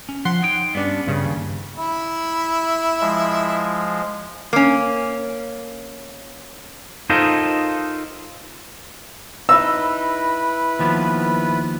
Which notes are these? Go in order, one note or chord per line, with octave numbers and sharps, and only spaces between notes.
C#4
F3 F#5 C6
D#4 C#5 G5
G2 B3 C#4 D4
G2 C#3
D#2
E4 E5 B5
F3 G#3
A#3 C#4
D#4 F4 A4 A#4 C5 D#5
D#4 E4 B4 E6
D#2 F3 B3